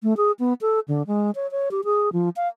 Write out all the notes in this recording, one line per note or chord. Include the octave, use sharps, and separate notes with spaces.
A3
G#4
B3
A4
D3
G#3
C#5
C#5
G4
G#4
F3
F5